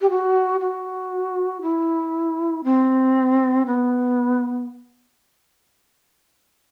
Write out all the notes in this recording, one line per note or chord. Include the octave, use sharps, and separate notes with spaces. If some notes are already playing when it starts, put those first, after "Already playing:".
G4
F#4
F#4
E4
C4
B3